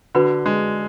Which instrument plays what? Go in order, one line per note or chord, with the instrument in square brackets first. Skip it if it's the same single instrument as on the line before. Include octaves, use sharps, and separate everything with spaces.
[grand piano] D3 [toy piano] F#4 B4 F#5 B5
[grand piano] G#3